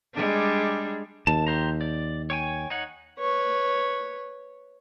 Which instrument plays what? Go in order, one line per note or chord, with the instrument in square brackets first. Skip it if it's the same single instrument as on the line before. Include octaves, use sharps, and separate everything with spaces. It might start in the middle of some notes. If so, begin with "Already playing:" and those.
[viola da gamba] G3 G#3 D4
[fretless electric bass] D#2 [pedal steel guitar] A5
[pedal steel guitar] G4 C5 A#5
D5
C#5 G5 G#5
D#4 C#5 F#5
[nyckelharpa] B4 C#5